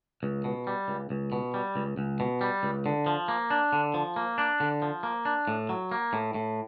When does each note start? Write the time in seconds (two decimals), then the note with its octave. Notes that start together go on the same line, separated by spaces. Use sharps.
0.23 C#2
0.44 B2
0.67 G3
0.88 C#2
1.10 C#2
1.32 B2
1.54 G3
1.76 C#2
1.97 C#2
2.20 B2
2.41 G3
2.63 C#2
2.86 D3
3.06 F3
3.28 A#3
3.50 D4
3.73 D3
3.94 F3
4.16 A#3
4.38 D4
4.60 D3
4.82 F3
5.03 A#3
5.25 D4
5.48 A2
5.69 F#3
5.92 A#3
6.13 A2
6.34 A2